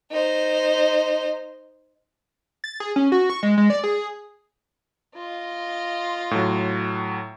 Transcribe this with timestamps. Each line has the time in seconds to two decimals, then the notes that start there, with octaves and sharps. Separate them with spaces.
0.11 D#4 C5
2.64 A6
2.80 G#4
2.96 C#4
3.12 F#4
3.30 C#6
3.43 G#3
3.58 G#3
3.70 D5
3.84 G#4
5.15 F4 D#5
6.31 A2 F#3